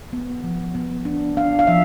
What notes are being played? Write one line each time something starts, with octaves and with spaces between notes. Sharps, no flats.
B3
F3
B3
D4
D4 F5
F5
F3 E5